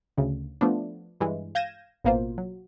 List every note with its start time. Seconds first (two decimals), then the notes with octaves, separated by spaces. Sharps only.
0.17 D2 C#3
0.61 F3 A3 B3 D4
1.21 G2 E3 G#3
1.55 F5 G6 G#6 A#6 D#7 E7
2.04 A1 B2 A#3 F4 C5
2.38 F#3